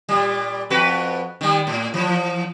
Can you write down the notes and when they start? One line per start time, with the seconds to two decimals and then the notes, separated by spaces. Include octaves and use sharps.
0.09 A#2 G3
0.70 F2 F#4 B4
1.41 D#3 G3
1.67 A2
1.94 E3 F3